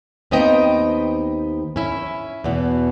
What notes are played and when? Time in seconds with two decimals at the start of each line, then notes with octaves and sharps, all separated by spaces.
0.31 D#2 B3 C4 D#4 D#5 G5
1.76 C#4 E4
2.44 E2 B2